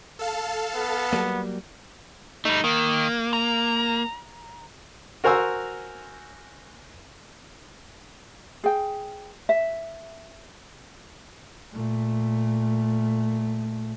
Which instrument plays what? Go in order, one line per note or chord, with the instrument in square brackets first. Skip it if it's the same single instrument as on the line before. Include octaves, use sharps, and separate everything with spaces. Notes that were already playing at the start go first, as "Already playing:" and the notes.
[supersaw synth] A4 F5 A5
[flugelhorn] B3
[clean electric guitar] F#3 G3 A#3
[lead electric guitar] G3 A3 [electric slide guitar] D#4
[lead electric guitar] D#3 [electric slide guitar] A#3
[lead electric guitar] A#5
[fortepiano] F#4 A#4 C5 G#5 A#5 E6
[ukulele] G#4 G5
E5
[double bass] A#2 A3